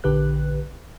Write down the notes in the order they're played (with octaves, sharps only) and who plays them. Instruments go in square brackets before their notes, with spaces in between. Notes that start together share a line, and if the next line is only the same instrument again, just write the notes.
[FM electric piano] A#1 D3 G4 B4 F#6